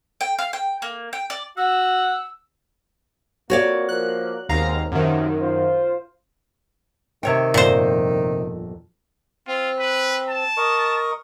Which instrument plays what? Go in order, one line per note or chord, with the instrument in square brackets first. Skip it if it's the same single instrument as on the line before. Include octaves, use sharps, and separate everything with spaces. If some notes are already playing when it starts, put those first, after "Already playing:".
[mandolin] G5
F5
G5
A#3
G5
D5
[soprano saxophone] F#4 [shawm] F#5 [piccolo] E6
[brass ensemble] F2 A#3 [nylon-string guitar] F#4 C#5 D5
[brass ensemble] F3 A#3 [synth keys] F#6
[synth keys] D#2 F5 A#5 [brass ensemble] B2 G#3 C4
[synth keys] F#2 D#3 [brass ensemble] C3 F3 F#3
[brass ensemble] F4 C5
[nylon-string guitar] C3 C#5 G5 [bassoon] D#3
[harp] G1 F2 A#5 [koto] A#2 C5
[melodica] C4 [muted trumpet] F4
[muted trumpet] B4
A5
[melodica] A#4 D#5 C#6